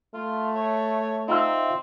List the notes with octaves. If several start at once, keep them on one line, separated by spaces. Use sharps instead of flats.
A3 F4
C#5
C4 D#4 F4 E5